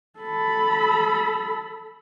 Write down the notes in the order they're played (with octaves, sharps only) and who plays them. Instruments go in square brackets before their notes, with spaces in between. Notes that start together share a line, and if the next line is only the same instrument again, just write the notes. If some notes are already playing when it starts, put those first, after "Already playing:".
[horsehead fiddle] A4 B5